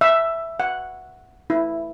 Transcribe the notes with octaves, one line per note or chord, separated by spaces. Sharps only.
E5
F#5
E4